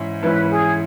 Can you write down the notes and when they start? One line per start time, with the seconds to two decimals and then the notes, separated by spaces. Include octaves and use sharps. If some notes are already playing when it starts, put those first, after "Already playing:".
Already playing: G#2 E3 C#4 E4
0.23 G#2 E3 C#4 E4 B4
0.50 G#4